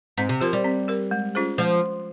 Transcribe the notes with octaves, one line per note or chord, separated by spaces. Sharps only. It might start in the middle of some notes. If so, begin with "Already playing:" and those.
G#2 C4
C3
F3 G4 A#4
G3
C4
G4 A#4
G#3
C#4 F4 G#4 C5
F3 G#3